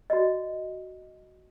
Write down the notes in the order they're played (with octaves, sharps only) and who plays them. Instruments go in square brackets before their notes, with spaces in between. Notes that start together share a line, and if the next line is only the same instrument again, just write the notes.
[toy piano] F#4 D5 D#5